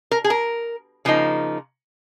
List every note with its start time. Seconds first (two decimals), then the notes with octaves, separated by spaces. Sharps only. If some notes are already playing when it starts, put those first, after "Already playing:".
0.11 A#4
0.24 G#4
0.30 A#4
1.05 C#3 F3 A#3 D#4